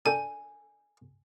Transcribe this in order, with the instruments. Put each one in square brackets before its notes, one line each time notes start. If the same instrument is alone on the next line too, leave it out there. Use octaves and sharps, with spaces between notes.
[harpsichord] D4 A4 G5 [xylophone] G#5